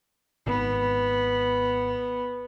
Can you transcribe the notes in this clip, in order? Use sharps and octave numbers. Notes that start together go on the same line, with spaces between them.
G#1 B3